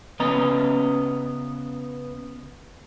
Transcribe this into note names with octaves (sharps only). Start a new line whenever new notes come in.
C#3 B3 D#5 A#5